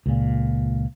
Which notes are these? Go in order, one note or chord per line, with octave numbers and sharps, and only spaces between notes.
C#2 A#2